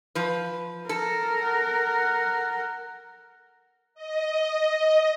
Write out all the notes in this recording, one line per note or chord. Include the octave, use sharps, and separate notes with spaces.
F3 B4
A4 A#4
F#5
D#5